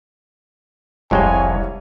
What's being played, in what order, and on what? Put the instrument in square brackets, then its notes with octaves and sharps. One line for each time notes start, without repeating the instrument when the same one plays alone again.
[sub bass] F1 [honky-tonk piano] C2 G3 C#5 [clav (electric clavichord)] F2 G#3 C5 [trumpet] G#5